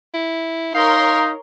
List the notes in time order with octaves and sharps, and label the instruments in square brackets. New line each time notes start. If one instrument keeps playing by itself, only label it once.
[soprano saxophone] E4
[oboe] D#4 [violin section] A#4 C#5 C6 [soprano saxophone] F5